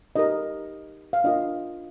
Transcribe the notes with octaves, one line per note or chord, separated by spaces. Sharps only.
D#4 G4 A#4 D#5
F5
D4 F4 A#4 D#5